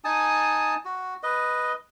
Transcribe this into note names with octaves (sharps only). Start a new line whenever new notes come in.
D#4 G#5 A5 D#6
F#4
B4 D#5